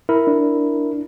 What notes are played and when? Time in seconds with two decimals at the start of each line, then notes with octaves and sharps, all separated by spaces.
0.09 E4 A#4
0.27 D4